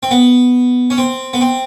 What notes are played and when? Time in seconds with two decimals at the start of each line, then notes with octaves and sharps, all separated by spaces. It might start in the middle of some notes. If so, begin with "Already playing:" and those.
0.03 C4
0.11 B3
0.90 C#4
0.98 C4
1.33 B3
1.41 C4